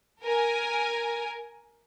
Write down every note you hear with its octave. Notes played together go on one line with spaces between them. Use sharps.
A#4 G#5